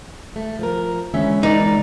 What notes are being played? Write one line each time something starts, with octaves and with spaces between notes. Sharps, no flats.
A3
F3 A#4
D3 E3 G#3 C#4 E5
E3 D#4 A#4 D5